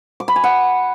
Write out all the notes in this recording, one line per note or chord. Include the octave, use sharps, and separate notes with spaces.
D6
B5
G#5
F#5